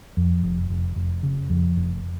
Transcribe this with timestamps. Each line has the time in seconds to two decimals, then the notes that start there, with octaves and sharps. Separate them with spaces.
0.17 F2
0.43 F1
0.70 F1
0.96 F1
1.23 C#3
1.50 F2
1.77 F1